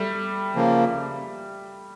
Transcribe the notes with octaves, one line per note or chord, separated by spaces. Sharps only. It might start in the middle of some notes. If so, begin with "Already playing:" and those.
Already playing: G3 A3
C#3 F3 A#3